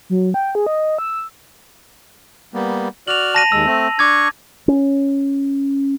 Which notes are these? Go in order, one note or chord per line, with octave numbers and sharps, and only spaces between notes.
F#3
G5
G#4
D#5
E6
G3 A#3 B3
F#4 D5 F6 F7 F#7
A5 A#6 D#7
D#2 G#3 E6
A3 C4
D4 C#6 D6 G#6
C#4